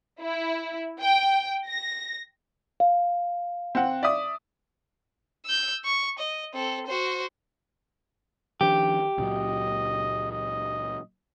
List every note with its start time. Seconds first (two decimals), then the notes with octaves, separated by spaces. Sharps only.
0.21 E4
1.00 G5
1.67 A#6
2.80 F5
3.75 C4 F#5
4.03 D5 E5 D#6
5.46 E6 G6
5.85 C#6
6.19 D#5
6.54 C4 A4
6.87 F#4 C5
8.61 D#3 F3 D4 G4
9.18 C#2 A#2 F#3 D#5
10.32 D#5